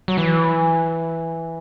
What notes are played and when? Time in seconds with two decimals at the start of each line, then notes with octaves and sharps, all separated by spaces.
0.08 F#3
0.18 E3